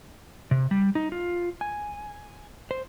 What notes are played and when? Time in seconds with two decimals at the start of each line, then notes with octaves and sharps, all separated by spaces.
0.51 C3
0.71 G3
0.95 D#4
1.12 F4
1.61 G#5
2.71 C5